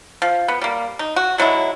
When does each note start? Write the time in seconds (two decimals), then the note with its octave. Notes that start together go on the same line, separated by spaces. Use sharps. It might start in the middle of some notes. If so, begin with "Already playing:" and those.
0.22 F3
0.48 B3
0.61 G3 A#3
0.99 D#4
1.16 F#4
1.38 D3 F#3 G#3 E4